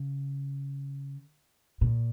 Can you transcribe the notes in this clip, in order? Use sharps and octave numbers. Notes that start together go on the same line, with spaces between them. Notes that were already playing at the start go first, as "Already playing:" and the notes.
Already playing: C#3
A#2